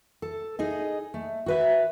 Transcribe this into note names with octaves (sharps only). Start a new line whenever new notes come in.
A4
D#4 G#4 D#5
A3
F#4 B4 E5